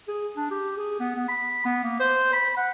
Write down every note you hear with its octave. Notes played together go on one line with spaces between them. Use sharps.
G#4
D4
G4
G#4
B3
B3
B5
B3
A#3
C5
B5
F#5